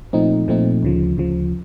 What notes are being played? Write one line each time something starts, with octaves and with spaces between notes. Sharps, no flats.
A#2 F3 A3 C4 D#4
A#2 F3 A3 C4 D#4
D2 C#3 F3
D2 C#3 F3